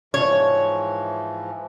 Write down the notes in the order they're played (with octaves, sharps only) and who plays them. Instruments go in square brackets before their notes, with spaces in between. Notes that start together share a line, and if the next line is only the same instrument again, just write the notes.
[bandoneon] G#2 E3 F3 [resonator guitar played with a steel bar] C#5